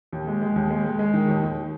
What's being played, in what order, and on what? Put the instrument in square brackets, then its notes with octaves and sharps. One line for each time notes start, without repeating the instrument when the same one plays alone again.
[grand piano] D#2
G#3
G#3
D#2
G#3
G#3
G#3
D#3
D#2
D#2